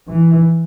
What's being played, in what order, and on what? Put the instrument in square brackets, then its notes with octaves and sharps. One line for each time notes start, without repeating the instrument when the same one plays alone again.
[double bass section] E3